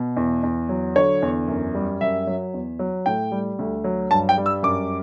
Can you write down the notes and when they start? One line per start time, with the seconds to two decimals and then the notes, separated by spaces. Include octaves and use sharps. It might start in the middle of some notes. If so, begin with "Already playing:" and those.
Already playing: B2
0.17 E2
0.43 E2
0.69 F#3
0.96 D3 C#5
1.22 E2
1.48 F#2
1.75 G3
2.01 F#2 E5
2.27 F#3
2.54 E2
2.79 F#3
3.06 A2 G5
3.32 G3
3.59 D2
3.84 F#3
4.11 G2 A5
4.29 G5
4.38 G3
4.46 E6
4.63 F#2 D6